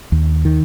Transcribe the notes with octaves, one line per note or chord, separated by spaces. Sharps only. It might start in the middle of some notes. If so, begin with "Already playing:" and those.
D#2
D#3